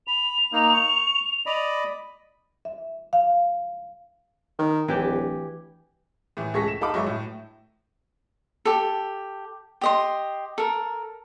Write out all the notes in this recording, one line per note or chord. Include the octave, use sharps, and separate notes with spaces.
B5 F7
A#3 D#4
C#6
D5 D#5 B5
E5
F5
D#3
D1 E3 G4
A2 E3
C#2 G#4 A4 C#6 A#6 B6
E7
D#4 A4 F5 B5 D6
G1 F#3 G#3 E5 C#6
A2
G4 A4
G4 D#5 C6
A4 A#4